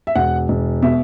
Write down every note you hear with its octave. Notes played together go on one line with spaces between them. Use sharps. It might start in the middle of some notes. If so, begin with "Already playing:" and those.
E5
E1 F#5
E1
B2 E5